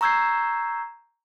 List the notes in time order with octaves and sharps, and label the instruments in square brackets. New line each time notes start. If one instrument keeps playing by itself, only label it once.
[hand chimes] A#5 C#6 E6 G6 G#6 C7